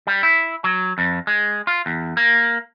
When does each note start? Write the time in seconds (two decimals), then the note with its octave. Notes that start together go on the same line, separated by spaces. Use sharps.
0.07 G3
0.23 E4
0.64 F#3
0.98 F2
1.27 G#3
1.67 F4
1.86 E2
2.17 A#3